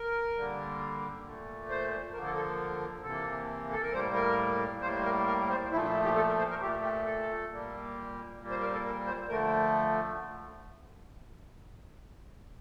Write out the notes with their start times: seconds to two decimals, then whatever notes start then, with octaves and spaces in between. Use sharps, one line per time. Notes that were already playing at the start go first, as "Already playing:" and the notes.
Already playing: A#4
0.36 D3 G3 A#3
1.25 A#2 A3
1.70 C5
2.14 D3 F3 A#3 A#4
2.26 A4
2.36 A4
3.03 C3 E3 A#3 A4
3.71 A4
3.83 A#4
3.93 A2 G3 A#3 C5
4.15 A#4
4.82 A2 G3 A#3 C5
5.04 A#4
5.27 A#4
5.50 C5
5.72 A#2 F3 A3 E4
5.82 D4
5.93 E4
6.05 G4
6.16 A4
6.28 A#4
6.39 C5
6.50 A#4
6.60 A#2 A3 G4
6.83 G4
7.05 A4
7.51 A#2 G3 A#3
8.39 A#2 G3 A#3
8.50 C5
8.61 A#4
8.73 A4
8.84 A#4
9.06 C5
9.28 D3 F3 A3 A#4